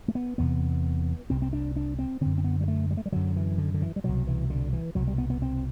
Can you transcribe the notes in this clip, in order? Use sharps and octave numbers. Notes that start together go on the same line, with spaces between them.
A3
B3
E2 C3 B3
C2 C3 C4
C4
D4
D4
C4
F#2 D3 C4
C4
B3
G3
A3
G3
A3
G3
F#2 D3 F#3
E3
D3
D3
E3
G3
C2 B2 F#3
E3
D3
E3
C2 B2 F#3
G3
B3
B3
C4